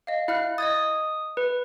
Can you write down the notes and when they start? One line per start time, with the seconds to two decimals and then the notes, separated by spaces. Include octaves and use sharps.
0.07 D#5 F5
0.28 E4 F5 F6 F#6
0.58 D#5 D#6 G#6 A6
1.37 B4